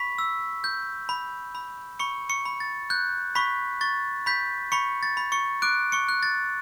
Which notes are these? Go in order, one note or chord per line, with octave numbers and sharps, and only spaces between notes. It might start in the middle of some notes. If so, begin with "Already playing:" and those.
Already playing: B5 C#6 B6
E6
G6
B5
B5
B5 C#6 C#7
C#6 C#7
B5
A6
F#6 G6
B5 C#6 B6
C#6 A6
B5 G6 B6
B5 C#6 C#7
A6
B5
C#6 C#7
D6 F#6 D7
C#6 C#7
F#6
A6